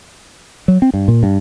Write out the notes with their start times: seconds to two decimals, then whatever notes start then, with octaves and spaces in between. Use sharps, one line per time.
0.68 F#3
0.82 C4
0.94 G2
1.08 A#2
1.23 G2